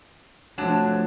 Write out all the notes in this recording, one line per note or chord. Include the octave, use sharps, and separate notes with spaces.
C3 F3 F#3 A3 D4 A5